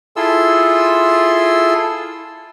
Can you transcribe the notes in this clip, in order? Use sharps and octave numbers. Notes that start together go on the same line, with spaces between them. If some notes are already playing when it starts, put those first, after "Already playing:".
E4 F4 G#4 A4 C6 E6